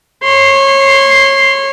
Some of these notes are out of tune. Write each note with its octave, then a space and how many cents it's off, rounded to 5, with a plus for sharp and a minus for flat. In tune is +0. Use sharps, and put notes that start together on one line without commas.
C#5 -25 C6 +0